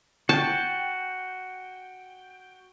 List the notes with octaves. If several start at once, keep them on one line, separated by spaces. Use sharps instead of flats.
F#4 G5 A5